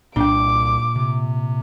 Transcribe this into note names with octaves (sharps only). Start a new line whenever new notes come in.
C2 A#2 D4 G5 D6
C3